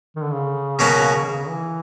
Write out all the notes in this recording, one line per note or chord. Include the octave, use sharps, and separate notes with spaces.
D#3
D3
C#3
B2 F#3 A#3 C#4 F#4
C#3
E3